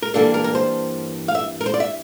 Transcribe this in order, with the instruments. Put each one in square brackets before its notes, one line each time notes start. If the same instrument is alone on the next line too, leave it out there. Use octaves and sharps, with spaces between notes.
[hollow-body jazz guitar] A#4
G2 E3 A#3 D4 A4
A#4
A#4
C5
F5
E5
A#4
C5
D5
E5